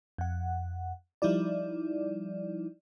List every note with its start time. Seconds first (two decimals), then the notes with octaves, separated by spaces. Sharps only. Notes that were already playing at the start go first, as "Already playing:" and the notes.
0.18 F2 F#5
1.22 F3 G3 D#4 E4 D5